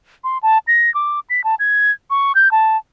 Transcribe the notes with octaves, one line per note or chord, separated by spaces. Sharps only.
C6
A5
A#6
D6
B6
A5
G#6
C#6
G6
A5